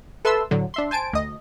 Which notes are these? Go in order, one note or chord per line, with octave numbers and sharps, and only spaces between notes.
A4 B4 E5 A5 C6 E6
A2 D3 F#3
D4 E5 C6
C5 G#5 A5 D7
D2 D#5